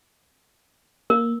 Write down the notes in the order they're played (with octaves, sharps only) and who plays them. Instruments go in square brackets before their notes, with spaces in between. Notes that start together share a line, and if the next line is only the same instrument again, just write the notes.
[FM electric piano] A#3 [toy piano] A#4